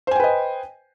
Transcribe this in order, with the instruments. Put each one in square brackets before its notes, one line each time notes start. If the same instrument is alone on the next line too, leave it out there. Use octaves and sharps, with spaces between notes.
[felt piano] C5
G#5
G5
B4
D#5